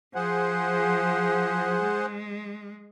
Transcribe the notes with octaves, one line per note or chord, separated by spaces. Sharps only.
F3 G#4 C5 F#5
G#3